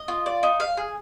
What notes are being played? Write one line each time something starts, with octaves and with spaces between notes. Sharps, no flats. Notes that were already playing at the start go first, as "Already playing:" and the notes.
Already playing: D#5
F4
D5
D#4
F5
G#4